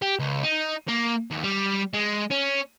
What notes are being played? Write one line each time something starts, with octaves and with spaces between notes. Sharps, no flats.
G4
C#2
D#4
A#3
D#2
G3
G#3
C#4